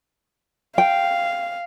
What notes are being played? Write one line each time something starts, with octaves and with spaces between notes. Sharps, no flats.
F5 G5